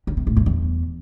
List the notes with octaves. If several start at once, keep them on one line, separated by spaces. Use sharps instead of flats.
D3
C3
A2
F#2
E2